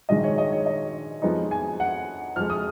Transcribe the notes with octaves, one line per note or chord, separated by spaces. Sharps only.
A#1 G#2 D#3 G#3 D#5
C#5
D#5
C#5
D#5
F2 F3 G#3 B3 D#4
G#5
F#5
F2 F3 G#3 F6
D#6